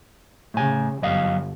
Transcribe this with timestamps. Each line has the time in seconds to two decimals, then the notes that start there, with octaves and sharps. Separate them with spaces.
0.54 A2 C#3 G#5
1.02 G1 F#2 D#5 F5